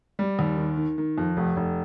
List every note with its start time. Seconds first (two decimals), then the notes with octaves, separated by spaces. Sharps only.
0.19 G3
0.39 D#2
0.57 D#3
0.77 D#3
0.98 D#3
1.18 F2
1.37 F1
1.57 F1